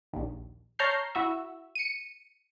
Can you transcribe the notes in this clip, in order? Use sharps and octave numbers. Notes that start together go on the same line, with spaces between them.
A#1 D#2
C#5 A5 A#5 F6 G6 C7
E4 F#4 E5
C#7 D#7